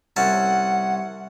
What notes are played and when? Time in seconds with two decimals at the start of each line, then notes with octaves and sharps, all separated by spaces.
0.16 C2 C#4 F#5 A5